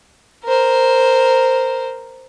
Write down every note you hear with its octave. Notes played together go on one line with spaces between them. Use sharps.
A#4 C5